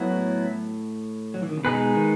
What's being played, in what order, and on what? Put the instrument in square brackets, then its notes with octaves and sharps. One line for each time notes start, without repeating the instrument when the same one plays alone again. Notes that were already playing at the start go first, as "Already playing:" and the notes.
Already playing: [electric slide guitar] A2 [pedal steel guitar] F#3 B3 E4
[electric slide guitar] F#3
E3
D#3
C#3
[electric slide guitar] B2 [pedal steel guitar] G#3 D#4 G#4 B4
[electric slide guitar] D#3